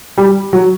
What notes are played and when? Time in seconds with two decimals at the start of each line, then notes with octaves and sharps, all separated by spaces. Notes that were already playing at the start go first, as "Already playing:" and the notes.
0.18 G3
0.53 F#3